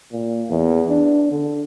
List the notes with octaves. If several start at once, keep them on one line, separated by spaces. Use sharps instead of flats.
A#2
E2
D4
D3